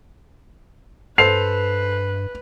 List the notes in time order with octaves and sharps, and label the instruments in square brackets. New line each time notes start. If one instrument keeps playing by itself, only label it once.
[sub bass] G2 [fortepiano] A4 C5 [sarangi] B4 [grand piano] C7 F7